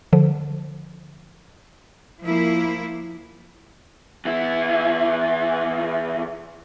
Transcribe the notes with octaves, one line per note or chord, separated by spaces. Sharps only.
D3 F3
F3 A#3 E4
E2 E4